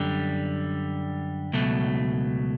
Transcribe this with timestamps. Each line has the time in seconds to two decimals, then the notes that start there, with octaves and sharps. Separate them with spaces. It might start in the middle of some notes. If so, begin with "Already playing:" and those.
Already playing: F#2 D3 G3
1.53 C#2 B2 F#3 A3